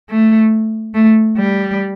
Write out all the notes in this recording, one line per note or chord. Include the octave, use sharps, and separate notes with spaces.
A3
A3
G3